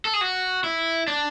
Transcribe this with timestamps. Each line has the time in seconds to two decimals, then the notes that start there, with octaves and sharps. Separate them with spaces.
0.05 A4
0.14 G#4
0.21 F#4
0.64 E4
1.08 D4